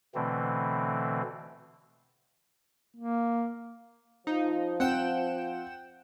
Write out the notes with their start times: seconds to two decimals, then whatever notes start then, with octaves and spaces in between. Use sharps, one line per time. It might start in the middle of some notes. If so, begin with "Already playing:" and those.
0.15 B2 D3 E3 A3 C4
2.97 A#3
4.27 F3 D#4
4.80 C4 F#5 G5 E7